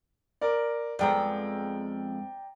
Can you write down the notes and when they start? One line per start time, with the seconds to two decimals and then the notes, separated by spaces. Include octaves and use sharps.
0.41 A#4 D5
0.99 F2 G#3 B3 D5 G5 A#5